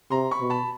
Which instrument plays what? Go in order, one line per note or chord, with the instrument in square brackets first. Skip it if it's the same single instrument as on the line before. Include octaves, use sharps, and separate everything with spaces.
[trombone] C3 [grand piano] A#5 C6
[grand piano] B5 C#6
[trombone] B2
[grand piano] A5 B5